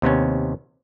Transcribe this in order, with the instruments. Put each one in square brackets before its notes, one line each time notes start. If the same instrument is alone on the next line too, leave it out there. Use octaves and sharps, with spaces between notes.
[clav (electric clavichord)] D#2 C3 B3 C#4